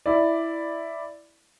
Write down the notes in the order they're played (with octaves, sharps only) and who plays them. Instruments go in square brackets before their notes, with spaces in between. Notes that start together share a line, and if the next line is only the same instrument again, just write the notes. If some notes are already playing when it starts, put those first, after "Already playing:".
[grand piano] E4 D5